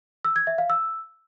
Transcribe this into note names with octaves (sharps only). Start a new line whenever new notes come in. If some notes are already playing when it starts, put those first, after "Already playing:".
E6
G#6
E5
F5
E6